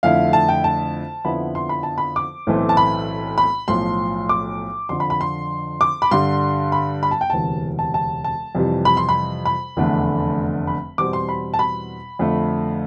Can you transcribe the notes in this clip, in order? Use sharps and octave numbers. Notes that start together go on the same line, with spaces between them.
F2 D3 A3 E4 F5
A5
G5
A5
F2 D3 F3 B3 E4 B5
C6
B5
A5
B5
D6
B1 A2 E3 A3 C4
A5
B5
B5
B1 A2 F3 C6
D6
F2 D3 F3 C6
B5
B5
C6
D6
B5
G2 D3 G3 C6
B5
B5
A5
G5
E1 D2 C3 E3 A5
A5
A5
A5
F2 C3 E3 G3
B5
C6
B5
B5
F1 E2 D3 A3 D4
B5
E2 B2 G3 C4 D6
C6
B5
A5
B5
F2 D3 A3